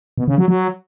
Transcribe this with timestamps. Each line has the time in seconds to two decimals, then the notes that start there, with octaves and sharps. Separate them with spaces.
0.18 B2
0.28 C#3
0.38 F#3
0.48 F#3